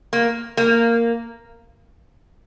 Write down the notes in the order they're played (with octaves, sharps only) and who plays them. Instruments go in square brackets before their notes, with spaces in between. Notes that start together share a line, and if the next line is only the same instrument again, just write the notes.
[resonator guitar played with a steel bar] A#3
A#3